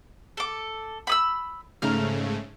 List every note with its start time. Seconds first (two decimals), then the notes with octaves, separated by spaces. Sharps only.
0.37 A4 D6
1.07 B5 D#6 E6
1.82 G#2 C#3 A3 A#5 F6